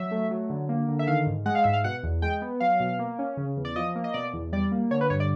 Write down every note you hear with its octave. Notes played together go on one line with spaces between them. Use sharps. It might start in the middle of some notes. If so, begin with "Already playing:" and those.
Already playing: F#3 E5
A3
F#3
D3
A#3
D3
E5
D#3 F5
G#2
G#3 F#5
F5
G#2 E5
F5
B2 F#5
E2
G#3 G5
B3
F#3 F5
B2
A#3
C#4
C#3
E2
D5
F3 D#5
A#3
D#5
B2 D5
E2
G3 D5
A#3
D3 C#5
B4
G2 C#5
D5